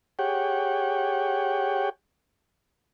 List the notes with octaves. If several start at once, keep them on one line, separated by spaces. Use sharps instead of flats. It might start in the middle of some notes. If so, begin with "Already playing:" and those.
G4 G#4 C#5 F#5 G5